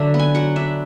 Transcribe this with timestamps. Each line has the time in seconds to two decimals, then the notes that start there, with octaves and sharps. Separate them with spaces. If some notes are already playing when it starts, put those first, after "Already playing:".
Already playing: D3 F#3 D4 E5
0.14 B3
0.19 G#5
0.35 F#3 F#5
0.56 D4 E5